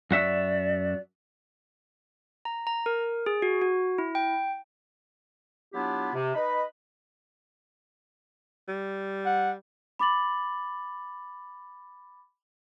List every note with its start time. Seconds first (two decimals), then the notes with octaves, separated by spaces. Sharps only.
0.11 F#2 F#4 D5 E5
2.45 A#5
2.67 A#5
2.86 A#4
3.26 G#4
3.42 F#4
3.62 F#4
3.98 E4
4.15 G5
5.73 F#3 B3 D4 E4 F4 G4
6.14 C3
6.35 D#4 B4 D#5 B5
8.68 G3
9.26 F#5
9.99 B5 D6 A6 F#7